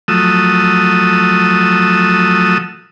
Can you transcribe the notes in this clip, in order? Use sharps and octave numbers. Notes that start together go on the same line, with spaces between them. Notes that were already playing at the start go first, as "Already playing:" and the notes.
F3 F#3 A3 D#6 E6